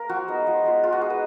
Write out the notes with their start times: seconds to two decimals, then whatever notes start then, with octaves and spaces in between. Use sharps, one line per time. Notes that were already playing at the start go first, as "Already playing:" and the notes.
Already playing: A#3 A#4
0.09 F3 F#4
0.28 G#3 B3 D#4
0.47 F3
0.64 G#3 B3 F4
0.83 G#3 F4
0.92 F#4
1.02 D#4 G#4
1.10 B4